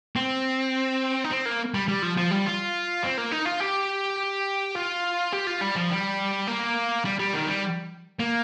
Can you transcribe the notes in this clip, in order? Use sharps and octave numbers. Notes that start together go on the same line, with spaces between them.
C4
D#4
C4
A#3
G3
G3
F3
F3
G3
F4
C4
A#3
D#4
F4
G4
F4
G4
F4
G3
F3
G3
A#3
G3
G3
D#3
G3
A#3